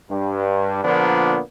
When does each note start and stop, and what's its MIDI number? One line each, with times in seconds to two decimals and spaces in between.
0.11 0.84 43
0.84 1.39 46
0.84 1.39 50
0.84 1.39 53
0.84 1.39 58
0.84 1.39 59
0.84 1.39 62